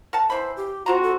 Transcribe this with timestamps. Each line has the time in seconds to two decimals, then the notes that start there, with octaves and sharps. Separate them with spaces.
0.13 A#4 F#5 A5
0.30 E3 C5 B5
0.57 G4
0.86 C4 F4 F#4 C5 A#5
1.03 A4